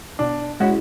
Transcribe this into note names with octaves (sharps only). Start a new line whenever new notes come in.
B2 D4
G#3 C#4 E4 F#4